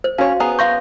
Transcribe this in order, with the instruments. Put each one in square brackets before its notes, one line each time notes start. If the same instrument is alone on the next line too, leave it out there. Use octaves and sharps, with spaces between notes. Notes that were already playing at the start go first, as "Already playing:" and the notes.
[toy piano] C5
[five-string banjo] C#4 C#5 [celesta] F#4 F5
[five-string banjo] B3 G#4 A#5
[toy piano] F5 C6 C#6 [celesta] G6 A#6